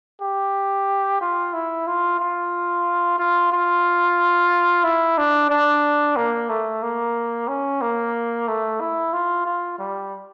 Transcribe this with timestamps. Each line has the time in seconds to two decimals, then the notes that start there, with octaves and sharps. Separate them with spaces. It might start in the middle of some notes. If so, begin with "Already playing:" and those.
0.22 G4
1.21 F4
1.54 E4
1.87 F4
2.20 F4
3.19 F4
3.52 F4
4.84 E4
5.18 D4
5.50 D4
6.17 A#3
6.49 A3
6.83 A#3
7.48 C#4
7.82 A#3
8.48 A3
8.81 E4
9.13 F4
9.46 F4
9.79 G3